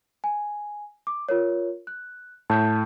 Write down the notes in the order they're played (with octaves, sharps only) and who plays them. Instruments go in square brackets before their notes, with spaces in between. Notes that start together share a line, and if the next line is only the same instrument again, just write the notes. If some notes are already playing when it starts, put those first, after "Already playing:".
[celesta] G#5
D6
F4 A#4 C#5
F#6
[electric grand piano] A2 [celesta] A5 G6